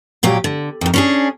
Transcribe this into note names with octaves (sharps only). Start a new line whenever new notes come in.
D#2 A#2 F#3 G4
D3
F2 D#3
C#4 D4 G#4